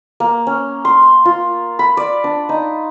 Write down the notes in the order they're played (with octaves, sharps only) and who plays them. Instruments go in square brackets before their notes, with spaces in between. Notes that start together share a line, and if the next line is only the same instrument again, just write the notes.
[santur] A#3
C#4
C6
F4
B5
D5
D4
D#4